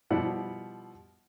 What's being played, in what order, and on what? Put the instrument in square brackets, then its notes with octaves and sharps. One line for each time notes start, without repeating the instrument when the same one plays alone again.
[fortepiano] B2 F3 G3 E4 D5 F#5